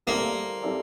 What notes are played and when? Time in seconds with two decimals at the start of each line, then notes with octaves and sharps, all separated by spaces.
0.07 G3 A#3 C4 E4 A4 D5
0.62 G3 C4 E4 A4 D5